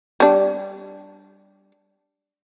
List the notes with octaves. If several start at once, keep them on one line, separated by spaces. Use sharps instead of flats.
G3 D4